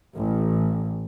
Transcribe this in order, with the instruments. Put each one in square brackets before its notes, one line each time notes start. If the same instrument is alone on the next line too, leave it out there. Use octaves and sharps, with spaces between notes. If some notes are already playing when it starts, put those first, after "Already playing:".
[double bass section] A1